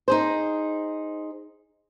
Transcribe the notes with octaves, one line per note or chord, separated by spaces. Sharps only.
D#4 G#4 C5